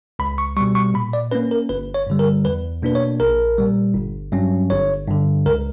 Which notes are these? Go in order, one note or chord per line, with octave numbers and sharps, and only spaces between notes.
C#2 B5
C#6
B2 G3 C#6
C#6
A#2 B5
D5
A#3 C#4 B4
A#4
G1 B4
C#5
G2 D3 G3
A#4
E2 B4
B2 A#3 D4 B4
C#5
A#1 A#4
A#2 G3
G1
G2 F#3 C#4
G1 C#5
G2 D3
C#2 A#4